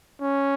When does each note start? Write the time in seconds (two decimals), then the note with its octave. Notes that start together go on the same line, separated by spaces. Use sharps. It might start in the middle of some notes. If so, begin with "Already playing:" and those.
0.21 C#4